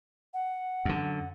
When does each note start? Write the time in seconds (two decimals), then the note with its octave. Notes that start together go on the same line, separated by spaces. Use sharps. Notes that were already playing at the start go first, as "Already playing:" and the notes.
0.34 F#5
0.85 F#2 D3